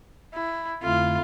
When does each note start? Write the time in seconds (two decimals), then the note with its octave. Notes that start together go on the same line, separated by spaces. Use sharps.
0.34 E4
0.83 F2 D3 A3 E4 F4